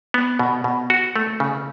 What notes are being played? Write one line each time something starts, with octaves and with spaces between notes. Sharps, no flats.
B3
B2
B2
F#4
A3
C#3